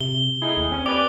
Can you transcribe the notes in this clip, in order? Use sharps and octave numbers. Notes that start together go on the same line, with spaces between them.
C3 G7
A2 D#4 E4 G#4
D#2
C4 C#4
G4 B4 D5 D6